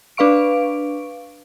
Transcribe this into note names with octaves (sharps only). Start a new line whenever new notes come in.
D4 B4 F5 C#6 D7